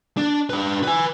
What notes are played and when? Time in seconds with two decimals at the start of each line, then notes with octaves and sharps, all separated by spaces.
0.17 D4
0.50 D4 B4
0.83 B4 G#5